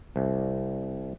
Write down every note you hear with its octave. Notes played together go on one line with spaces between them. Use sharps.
C2